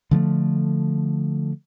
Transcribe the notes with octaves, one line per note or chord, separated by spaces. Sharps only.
D3 F3 G#3 A3